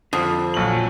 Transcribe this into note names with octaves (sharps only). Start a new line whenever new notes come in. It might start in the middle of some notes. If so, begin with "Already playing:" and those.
F2 D3 F3
A#1 F#3 F#7